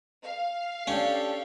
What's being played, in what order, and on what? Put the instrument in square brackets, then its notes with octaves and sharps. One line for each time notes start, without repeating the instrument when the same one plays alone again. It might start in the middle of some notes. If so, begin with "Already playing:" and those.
[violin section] F5
[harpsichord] C#4 [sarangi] D4 [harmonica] G4 A4